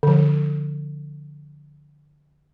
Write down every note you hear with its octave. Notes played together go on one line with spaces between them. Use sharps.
D3 F3